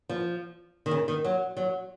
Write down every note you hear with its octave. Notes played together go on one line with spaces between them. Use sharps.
F3
D#3
C#3
D#3
F#3
F#3